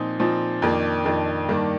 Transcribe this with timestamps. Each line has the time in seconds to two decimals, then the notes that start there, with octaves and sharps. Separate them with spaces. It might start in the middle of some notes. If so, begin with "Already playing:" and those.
Already playing: A#2 F3 C4 D#4
0.20 A#2 F3 C4 D#4
0.62 F2 D#3 A#3 D4
1.05 F2 D#3 A#3 D4
1.49 G2 D#3 A#3 D4